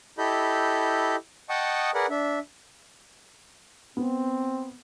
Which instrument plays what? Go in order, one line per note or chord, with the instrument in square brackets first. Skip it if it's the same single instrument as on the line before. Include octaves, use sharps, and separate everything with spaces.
[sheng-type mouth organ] E4 G4 A4 D#5 B5 G6
D#5 F#5 G5 A5 C#6 D#6
G#4 A#4 B4 D5 F#5
D4 E5
[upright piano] B3 [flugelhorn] C4